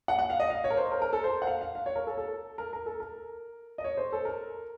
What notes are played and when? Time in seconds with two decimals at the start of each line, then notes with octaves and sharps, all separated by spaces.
0.08 F#5
0.19 F#5
0.30 F5
0.40 D#5
0.50 F5
0.64 C#5
0.70 A#4
0.77 C5
0.91 A#4
1.02 A#4
1.13 A4
1.24 C5
1.42 F#5
1.47 F5
1.61 F5
1.75 F5
1.86 C#5
1.96 A#4
2.07 A4
2.17 A4
2.58 A#4
2.73 A#4
2.86 A4
3.00 A#4
3.78 D#5
3.84 C#5
3.97 C5
4.12 A4
4.25 A#4